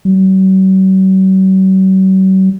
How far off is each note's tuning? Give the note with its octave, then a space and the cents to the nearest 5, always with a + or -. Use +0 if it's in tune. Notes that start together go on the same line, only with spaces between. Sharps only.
F#3 +45